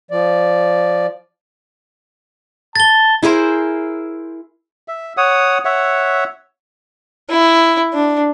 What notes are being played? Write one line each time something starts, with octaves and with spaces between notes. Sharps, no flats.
F3 D5
A5 A6 G7
E4 G#4 A#4 C5
E5
C#5 F#5 D#6
C#5 E5 F#5
E4
D4